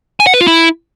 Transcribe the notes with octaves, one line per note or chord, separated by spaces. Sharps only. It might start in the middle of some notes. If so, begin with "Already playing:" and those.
G#5
F#5
B4
F4
E4